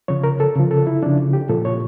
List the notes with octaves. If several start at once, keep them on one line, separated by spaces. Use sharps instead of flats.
C#3 F3 C#5
A#4
A4
C#3 F3
A4
E4
C#3 F3 D4
G4
A#2 F3 A4
C#5